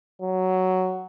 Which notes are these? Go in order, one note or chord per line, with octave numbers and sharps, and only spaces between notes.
F#3